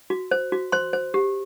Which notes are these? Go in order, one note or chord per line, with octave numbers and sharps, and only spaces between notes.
F#4
C5
F#4
C5 C6
C5
G4